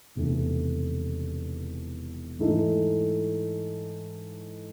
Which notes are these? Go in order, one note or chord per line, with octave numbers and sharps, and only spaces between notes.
E1 E2 C3 D#3 A3
G#2 E3 A3 D#4